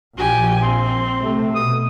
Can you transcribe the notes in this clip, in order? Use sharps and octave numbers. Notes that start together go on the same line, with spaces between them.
A#1 F3 G4 G#5
C4 C6
C3 A3
B2 D#6